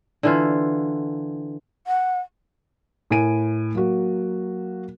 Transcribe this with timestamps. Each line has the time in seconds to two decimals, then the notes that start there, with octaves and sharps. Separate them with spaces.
0.23 D3 E3 F4
1.87 F#5
3.10 A2 A#4 G#5 D7 D#7
3.75 F#3 A#3 F#4